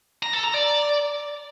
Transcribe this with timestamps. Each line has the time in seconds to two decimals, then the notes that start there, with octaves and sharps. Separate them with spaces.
0.23 A#5
0.33 A4
0.44 A#5
0.54 D5